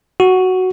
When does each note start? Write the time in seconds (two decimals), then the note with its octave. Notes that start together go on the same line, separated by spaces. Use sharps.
0.20 F#4